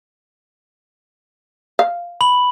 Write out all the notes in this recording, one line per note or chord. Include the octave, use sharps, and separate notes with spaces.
F5
B5 F#7